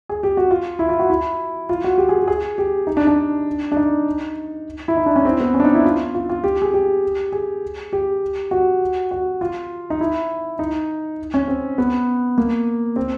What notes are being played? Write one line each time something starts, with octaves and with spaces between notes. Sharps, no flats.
G#4
G4
F#4
F4
E4
F4
F#4
E4
F4
F#4
G4
G#4
G4
G#4
G4
D#4
D4
D4
D4
D#4
E4
D#4
D4
C#4
C4
B3
C#4
D4
D#4
E4
F4
F4
F4
G4
G#4
G4
G#4
G4
F#4
F#4
F4
D#4
E4
D#4
C#4
C4
B3
A#3
C4